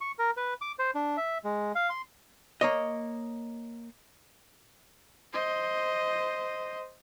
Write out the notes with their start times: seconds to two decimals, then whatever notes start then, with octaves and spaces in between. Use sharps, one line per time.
0.01 C#6
0.19 A#4
0.37 B4
0.61 D6
0.79 C5
0.95 D4
1.17 E5
1.44 G#3
1.75 F5
1.90 C6
2.61 A#3 C#5 D#5
5.33 C5 D#5